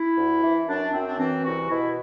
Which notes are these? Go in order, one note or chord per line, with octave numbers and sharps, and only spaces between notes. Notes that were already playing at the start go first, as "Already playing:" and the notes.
Already playing: E4
D2
E3
F#2 D4
F#2 C4
D4
E3 C4
C2 F#4
B2 E4